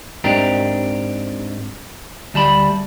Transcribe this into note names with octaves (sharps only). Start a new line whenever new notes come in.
G#2 C4 D4 G4 A#4
D2 G3 A5 B5